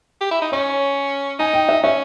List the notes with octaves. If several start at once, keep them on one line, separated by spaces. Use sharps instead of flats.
G4
E4
D#4
C#4 C#5
D#4 G#5
G5
E5
C#4 E5